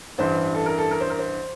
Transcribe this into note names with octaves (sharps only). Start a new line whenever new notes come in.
A1 G2 E3 C5
A4
A#4
A4
A#4
C5
A#4
C5